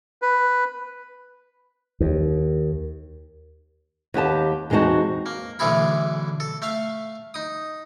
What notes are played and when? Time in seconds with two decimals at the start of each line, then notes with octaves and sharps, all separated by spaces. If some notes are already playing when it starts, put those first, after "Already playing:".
0.22 B4
2.00 D#2
4.14 D#2 B3 G4 A5
4.70 E2 G#3 C4 D#4 F#4 A5
5.26 A#3
5.59 B1 D3 E3 A3 G#4 B5
6.40 A4
6.62 A3 E5 F5
7.34 D#4 D#6